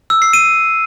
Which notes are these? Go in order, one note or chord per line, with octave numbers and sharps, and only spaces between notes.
E6
C7
D#7